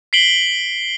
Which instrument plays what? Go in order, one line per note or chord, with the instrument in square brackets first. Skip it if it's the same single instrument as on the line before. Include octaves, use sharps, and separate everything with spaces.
[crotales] B6 C7 D7 F#7 G7